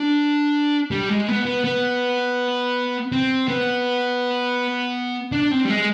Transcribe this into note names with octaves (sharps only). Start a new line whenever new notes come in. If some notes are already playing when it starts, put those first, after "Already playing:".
Already playing: D4
G3
G#3
B3
B3
B3
C4
B3
D4
C4
G3
G#3